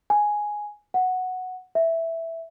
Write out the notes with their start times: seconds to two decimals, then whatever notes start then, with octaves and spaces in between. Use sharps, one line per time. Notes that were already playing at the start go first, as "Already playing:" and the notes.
0.10 G#5
0.94 F#5
1.75 E5